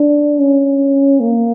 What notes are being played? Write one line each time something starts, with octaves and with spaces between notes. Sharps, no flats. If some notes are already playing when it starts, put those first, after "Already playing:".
Already playing: D4
C#4
A#3